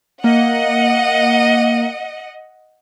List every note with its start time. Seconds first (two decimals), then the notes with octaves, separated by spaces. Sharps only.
0.24 A#3 D#5 F#5